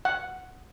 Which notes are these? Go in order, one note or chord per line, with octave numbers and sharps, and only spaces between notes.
F#5